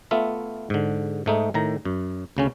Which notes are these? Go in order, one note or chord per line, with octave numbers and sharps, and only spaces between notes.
A3 B3 F4 E5
G#2 D3
G#2 A3 D#4
A2 D#3 A#5
F#2
D2 C#3 C#4